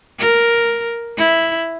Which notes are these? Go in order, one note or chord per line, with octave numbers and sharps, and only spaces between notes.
A#4
E4